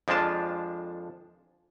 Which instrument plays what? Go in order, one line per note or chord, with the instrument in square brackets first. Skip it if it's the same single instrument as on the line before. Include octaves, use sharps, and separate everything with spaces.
[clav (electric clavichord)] F2 F3 G#3 D4 F4 A5